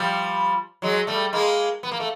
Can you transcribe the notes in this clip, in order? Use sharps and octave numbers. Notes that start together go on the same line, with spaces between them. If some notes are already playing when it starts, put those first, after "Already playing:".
Already playing: F3 G3
F#3 G#3
G3 A3
G#3 A#3
B3
A#3
A3